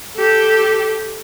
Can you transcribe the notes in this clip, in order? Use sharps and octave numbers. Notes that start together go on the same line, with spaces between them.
G4 A4